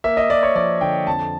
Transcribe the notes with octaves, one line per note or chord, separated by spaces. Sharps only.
A#3 E5
D#5
A#3 D5
C#5
F3 D5
D3 G5
F2 A5